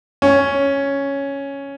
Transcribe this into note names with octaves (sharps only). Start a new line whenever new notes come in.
C#4